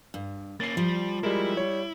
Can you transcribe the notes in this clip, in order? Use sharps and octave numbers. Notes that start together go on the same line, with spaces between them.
G2
A#3 C#4 A6 C7
F3 G3
G3 G#3 E4 A#4
G3 C#5